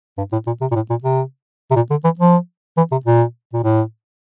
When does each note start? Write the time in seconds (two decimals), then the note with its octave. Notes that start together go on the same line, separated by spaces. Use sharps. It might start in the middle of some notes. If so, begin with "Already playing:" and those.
0.17 G2
0.32 A2
0.46 A#2
0.61 C3
0.71 A#2
0.75 A2
0.90 A#2
1.04 C3
1.71 C3
1.76 A#2
1.90 D3
2.04 E3
2.19 F3
2.77 E3
2.91 C3
3.05 A#2
3.53 A#2
3.64 A2